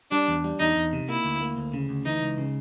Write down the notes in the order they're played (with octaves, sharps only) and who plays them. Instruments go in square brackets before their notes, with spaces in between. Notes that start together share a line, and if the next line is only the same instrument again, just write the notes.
[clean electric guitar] G3 [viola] D4
[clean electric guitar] E2
G3
[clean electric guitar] E2 [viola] D#4
[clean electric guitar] E2
C3
[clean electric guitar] A#3 [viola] E4
[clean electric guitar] D2
A#3
D2
C#3
D2
[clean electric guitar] E3 [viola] D#4
[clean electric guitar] C#2
C#3